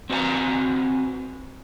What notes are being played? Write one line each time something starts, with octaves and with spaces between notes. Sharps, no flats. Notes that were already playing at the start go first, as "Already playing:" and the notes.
C4 F#4 B4 G#5 A#5